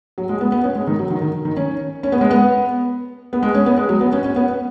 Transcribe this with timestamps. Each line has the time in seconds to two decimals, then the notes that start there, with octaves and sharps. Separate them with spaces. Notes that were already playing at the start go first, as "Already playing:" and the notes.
0.18 F#3
0.29 G#3
0.41 B3
0.52 B3
0.64 C#4
0.75 G#3
0.87 D#3
0.99 F#3
1.10 D#3
1.22 D#3
1.45 D#3
1.57 C#4
2.03 C#4
2.12 B3
2.21 G#3
2.31 B3
3.33 B3
3.43 G#3
3.54 C#4
3.66 B3
3.78 G#3
3.89 F#3
4.01 B3
4.12 C#4
4.24 C#4
4.36 B3